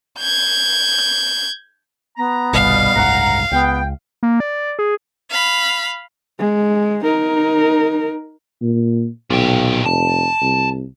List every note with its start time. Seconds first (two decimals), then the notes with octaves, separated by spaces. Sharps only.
0.19 G6 G#6
2.17 B3 A#5
2.53 G1 C2 B2 G3 F5
2.96 F#1 C2 G#2 F#5 A#5
3.52 C#2 B3 G5
4.23 A#3
4.40 D5
4.79 G#4
5.30 F5 B5
6.39 G#3
7.04 D#4 A#4
8.62 A#2
9.30 B1 A#2 G4
9.86 F1 A5
10.42 C2